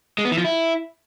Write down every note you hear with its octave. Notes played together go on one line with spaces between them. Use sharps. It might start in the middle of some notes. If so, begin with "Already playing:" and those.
G#3
B3
E3
F3
E4